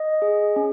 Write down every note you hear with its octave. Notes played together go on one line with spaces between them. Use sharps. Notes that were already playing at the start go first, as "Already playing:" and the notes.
Already playing: D#5
G#4
C#4